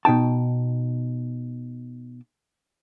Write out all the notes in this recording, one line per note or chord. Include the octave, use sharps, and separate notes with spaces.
B2 D#4 G5 A5